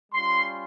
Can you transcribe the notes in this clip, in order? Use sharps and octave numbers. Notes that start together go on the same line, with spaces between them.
G3 C#4 F4 C6